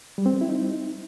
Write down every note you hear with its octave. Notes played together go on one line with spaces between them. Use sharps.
G3
C4
G3
E4
D#4